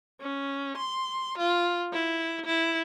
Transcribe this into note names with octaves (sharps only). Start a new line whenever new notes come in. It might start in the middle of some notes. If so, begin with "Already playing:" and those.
C#4
C6
F4
E4
E4